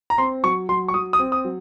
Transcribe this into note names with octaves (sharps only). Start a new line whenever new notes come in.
A#5
C4 C6
F#3 C#6
F#3 C6
C#6
F#3 D#6
D#6
C4
D#6
F#3